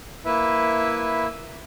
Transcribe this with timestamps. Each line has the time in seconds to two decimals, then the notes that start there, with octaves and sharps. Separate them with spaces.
0.25 A#3 E4 B4 E5